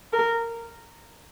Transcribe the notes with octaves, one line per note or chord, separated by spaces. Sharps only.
A#4